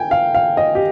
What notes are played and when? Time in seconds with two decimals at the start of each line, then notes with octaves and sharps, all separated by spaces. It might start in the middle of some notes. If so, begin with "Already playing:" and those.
Already playing: G5 G#5
0.11 F5
0.34 F5
0.57 D#5
0.75 G4